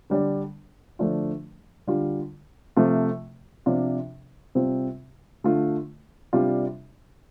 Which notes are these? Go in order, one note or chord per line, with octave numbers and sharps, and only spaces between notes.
D3 G3 D4
D3 F3 A3 D4 F4
D3 G3 F4
C3 F3 A3 F4
C3 F3 D4 F4
C3 G3 C4 F4
D3 A3 F4
C3 G3 D4 F4